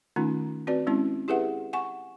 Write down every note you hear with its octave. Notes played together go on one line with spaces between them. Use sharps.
D#3 A3 C#4 D#4 F4
C4 F#4 B4 D5
G#3 C4 C#4 E4
E4 G4 G#4 B4 E5 F#5
F#5 G#5 C#6